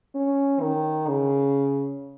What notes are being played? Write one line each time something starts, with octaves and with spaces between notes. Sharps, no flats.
C#4
D#3
C#3